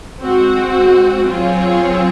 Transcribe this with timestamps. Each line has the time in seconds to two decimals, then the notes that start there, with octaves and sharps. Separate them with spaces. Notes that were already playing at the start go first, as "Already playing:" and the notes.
0.20 G#3 C4 F#4
1.27 F#3 C4 F4 G#4 C#5